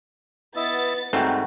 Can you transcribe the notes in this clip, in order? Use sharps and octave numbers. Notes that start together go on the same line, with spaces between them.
B3 E4 D#5 E5 A6
G#2 D#3 G3 A3 C4 F#4